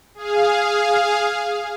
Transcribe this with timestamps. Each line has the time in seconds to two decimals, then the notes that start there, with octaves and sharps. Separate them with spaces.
0.15 G#4 F5